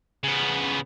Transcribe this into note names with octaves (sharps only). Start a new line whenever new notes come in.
C#3 B3